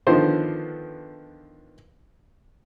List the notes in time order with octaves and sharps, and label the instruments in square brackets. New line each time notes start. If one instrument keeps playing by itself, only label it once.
[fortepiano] D3 D#3 F3 B3 C5